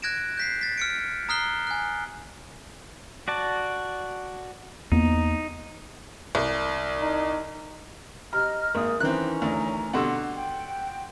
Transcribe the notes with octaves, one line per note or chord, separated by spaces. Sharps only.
F#6 G#6 A#6 D7 E7
G6 B6 C7
A6 B6
F6 C#7 D7
A#5 D#6 F6 F#6 C7 G7
G#5 F#6
F#4 D5 A5
E2 A#3 B3 D#4
C2
D#4
C3 D#5 A#5 F6
G#1 A#3 D#6
D#3 E3 C4 C#4 A#5 F#6
D2
B2 D3 G3 F#5 C6 E6
G5